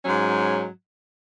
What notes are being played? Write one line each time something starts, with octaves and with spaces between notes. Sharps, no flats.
G#2 F#3 C#4